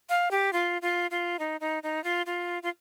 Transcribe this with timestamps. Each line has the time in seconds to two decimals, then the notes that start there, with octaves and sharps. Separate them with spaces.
0.09 F5
0.31 G4
0.53 F4
0.82 F4
1.11 F4
1.39 D#4
1.60 D#4
1.83 D#4
2.04 F4
2.26 F4
2.63 F4